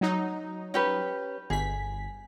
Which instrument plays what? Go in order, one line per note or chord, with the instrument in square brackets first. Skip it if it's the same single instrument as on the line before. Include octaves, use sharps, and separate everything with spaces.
[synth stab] F#3 D#4
[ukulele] C#4 G4 B4
[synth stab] G1 B6 [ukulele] G#4